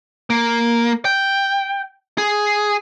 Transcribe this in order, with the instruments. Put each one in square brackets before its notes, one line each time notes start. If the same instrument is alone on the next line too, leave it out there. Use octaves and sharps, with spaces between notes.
[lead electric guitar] A#3
G5
G#4